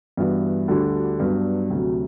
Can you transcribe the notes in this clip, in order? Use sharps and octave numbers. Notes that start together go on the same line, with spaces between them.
G2 E3 B3 F#4
D2 D3 G3 D4 F#4
G2 F#3 B3 D4
D2 C3 F#3